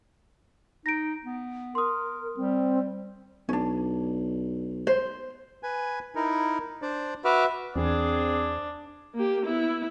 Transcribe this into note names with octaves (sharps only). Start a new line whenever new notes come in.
D#4 A#6 D7
B3
A#4 C6 D#6
G3 C4
B1 C#4 D4
C5
B4 G#5
D#4 E4 A#4
D4 C5 D5
F#4 B4 E5 D6 F6
E2 C4 D4 G#4
A#3 G4
B3 E4